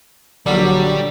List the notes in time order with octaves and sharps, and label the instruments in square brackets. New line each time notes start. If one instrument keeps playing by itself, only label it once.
[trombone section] A#1 F#3 [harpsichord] D3 [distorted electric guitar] G3